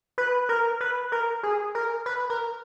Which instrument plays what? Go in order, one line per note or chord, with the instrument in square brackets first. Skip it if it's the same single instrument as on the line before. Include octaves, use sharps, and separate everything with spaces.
[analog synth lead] B4
A#4
B4
A#4
G#4
A#4
B4
A#4